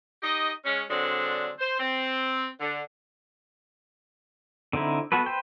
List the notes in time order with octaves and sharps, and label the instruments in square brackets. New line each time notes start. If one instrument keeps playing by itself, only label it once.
[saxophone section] D#4 G4 D#5
G#3 C#4
D3 F#3 G#3 C4 D4
C5
C4
D3
[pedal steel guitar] D3 C4 D#4 E4
B3 F#4 A4 B4
B4 C5 G5